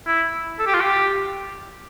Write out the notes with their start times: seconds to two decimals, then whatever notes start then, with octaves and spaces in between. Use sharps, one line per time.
0.07 E4
0.59 A4
0.67 G4
0.74 F4
0.81 G4